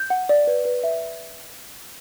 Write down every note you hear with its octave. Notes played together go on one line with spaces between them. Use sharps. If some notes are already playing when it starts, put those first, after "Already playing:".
Already playing: G6
F#5
D5
B4
B4
E5